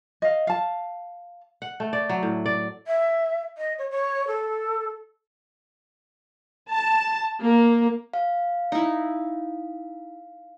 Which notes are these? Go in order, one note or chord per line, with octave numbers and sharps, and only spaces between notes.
D#5 F5
F5 A5
F#5
A3
D5
F#3
A2
D5
E5
D#5
C#5
C#5
A4
A5
A#3
F5
D#4 E4